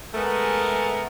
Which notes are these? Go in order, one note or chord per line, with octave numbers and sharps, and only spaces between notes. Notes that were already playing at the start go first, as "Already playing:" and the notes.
G#3 A3 B3 G#4 A#4